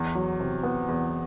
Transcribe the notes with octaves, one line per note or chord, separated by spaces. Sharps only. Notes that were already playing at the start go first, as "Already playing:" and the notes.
Already playing: E2
F#3
C3
B3
E2